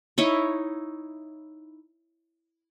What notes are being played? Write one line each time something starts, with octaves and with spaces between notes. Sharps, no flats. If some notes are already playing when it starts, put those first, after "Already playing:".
D#4 E4 C#5